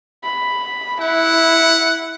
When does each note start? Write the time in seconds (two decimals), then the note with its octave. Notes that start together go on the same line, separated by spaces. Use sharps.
0.24 B5
1.01 E4 F#5